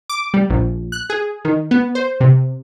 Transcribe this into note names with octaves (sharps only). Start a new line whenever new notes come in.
D6
G3
A#1
F#6
G#4
D#3
B3
C5
C3